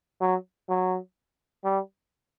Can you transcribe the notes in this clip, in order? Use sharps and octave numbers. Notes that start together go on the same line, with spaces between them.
F#3
F#3
G3